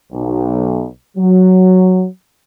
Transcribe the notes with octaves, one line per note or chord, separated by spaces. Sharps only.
B1
F#3